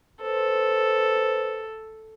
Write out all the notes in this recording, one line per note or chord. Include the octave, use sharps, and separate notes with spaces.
A4 B4 C5